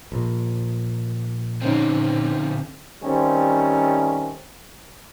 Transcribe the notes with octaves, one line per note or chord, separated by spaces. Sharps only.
A#1
D3 C4 C#4 D#4
D#3 G3 A3 C4 C#4